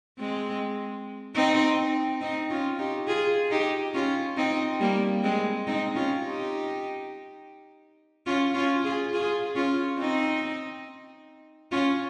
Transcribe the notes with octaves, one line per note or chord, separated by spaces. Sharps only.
G#3 C4
C4 D#4
C4 D#4
C#4 F4
D#4 G4
F4 G#4
D#4 G4
C#4 F4
C4 D#4
G3 A#3
G#3 C4
C4 D#4
C#4 F4
D#4 G4
C#4 F4
C#4 F4
F4 G#4
F4 G#4
C#4 F4
C4 D#4
C#4 F4